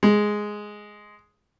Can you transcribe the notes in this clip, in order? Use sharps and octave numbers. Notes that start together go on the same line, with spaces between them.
G#3